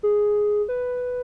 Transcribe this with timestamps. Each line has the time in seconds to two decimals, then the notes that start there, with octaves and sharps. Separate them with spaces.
0.03 G#4
0.69 B4